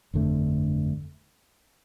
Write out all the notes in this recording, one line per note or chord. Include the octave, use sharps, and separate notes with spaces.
G1 F2 D3 A3